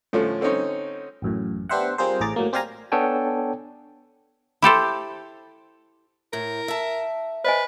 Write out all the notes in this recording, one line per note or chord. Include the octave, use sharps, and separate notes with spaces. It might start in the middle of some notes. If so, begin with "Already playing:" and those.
A2 D3 F3 C#4
D3 C4 C#4 D#4 C#5
A1 F#2 A2
B3 D4 G4 C5 E5 F#5
G3 C4 F4 G#4 A#4 C5
A1 A2 G#4 A#5 D6 A6
A2 F#3 A#3
C4 G4 D5 F5 G#5 A#5
B3 D4 A4 C#5 G5 G#5
E4 G4 A4 C5
A2 A#4
E5 A5
B4 C5 D#5 G#5